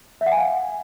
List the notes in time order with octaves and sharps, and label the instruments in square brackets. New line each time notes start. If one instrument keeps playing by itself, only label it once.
[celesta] E5
F#5
G#5
F5